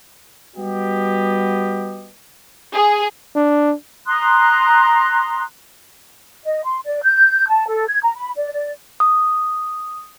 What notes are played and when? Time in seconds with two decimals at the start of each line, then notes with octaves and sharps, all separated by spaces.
0.57 G3 B3 F#4 G4 D#5
2.74 G#4
3.35 D4
4.07 A#5 C6 D#6 F#6
6.45 D#5
6.64 C6
6.85 D5
7.02 G6
7.49 A5
7.67 A4
7.88 G#6
8.02 A#5
8.15 B5
8.36 D5
8.53 D5
9.00 D#6